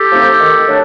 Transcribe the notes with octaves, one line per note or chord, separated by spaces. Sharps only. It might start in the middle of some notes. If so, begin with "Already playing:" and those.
Already playing: G4 A4
F3 A3 C4 D#4
D#3
F#3 A3 D4